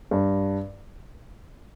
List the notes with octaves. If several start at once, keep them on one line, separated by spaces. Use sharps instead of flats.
G2